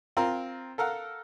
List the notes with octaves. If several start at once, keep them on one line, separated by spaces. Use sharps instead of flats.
C4 F4 A#4
A4 A#4 F5 F#5